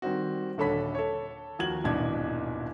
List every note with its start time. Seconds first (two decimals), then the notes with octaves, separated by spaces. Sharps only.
0.02 D#3 G3 C4 F#4
0.58 D#1 D3 A4 C#5 B5 B6
0.95 A4 C#5
1.59 D#2 F3 F#4 G#6 F#7
1.84 D#1 G#1 B2 E3 D4 G#6